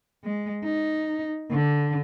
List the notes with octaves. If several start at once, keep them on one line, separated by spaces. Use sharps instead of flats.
G#3
D#4
D3